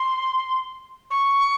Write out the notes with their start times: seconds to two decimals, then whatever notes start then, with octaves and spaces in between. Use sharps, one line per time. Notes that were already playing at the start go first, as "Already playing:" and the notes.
Already playing: C6
1.11 C#6